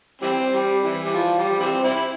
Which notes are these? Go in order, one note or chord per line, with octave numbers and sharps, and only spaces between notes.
E3 G3 C4
G3
E3
G3
F3
G3
E3 G3 C4
C4 E4